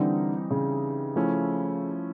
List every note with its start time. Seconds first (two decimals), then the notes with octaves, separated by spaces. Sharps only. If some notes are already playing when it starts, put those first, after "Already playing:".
Already playing: D3 E3 G3 C4 D#4
0.50 C#3
1.16 F3 A3 C#4 E4